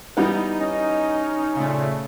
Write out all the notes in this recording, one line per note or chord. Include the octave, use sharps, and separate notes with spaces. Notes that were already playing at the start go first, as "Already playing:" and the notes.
E3 G3 B3 D#4
C#4 D#5
A#2 C#3 A3